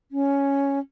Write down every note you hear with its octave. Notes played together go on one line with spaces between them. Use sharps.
C#4